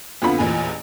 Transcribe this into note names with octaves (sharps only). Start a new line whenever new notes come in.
F2 D3 B3 F4 B5
A1 E2 A#2 G#5